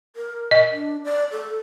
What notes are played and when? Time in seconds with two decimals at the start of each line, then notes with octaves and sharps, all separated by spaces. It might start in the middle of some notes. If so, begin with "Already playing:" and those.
0.16 A#4
0.51 D#5
0.72 D4
1.04 D5
1.31 A4